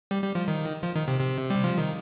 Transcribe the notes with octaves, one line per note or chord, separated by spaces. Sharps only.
G3
G3
F3
D#3
F3
D#3
C3
C3
G3
F3
D#3